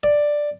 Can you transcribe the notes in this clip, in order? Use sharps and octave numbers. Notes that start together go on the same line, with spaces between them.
D5